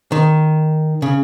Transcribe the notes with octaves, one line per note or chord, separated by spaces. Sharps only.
D#3
C#3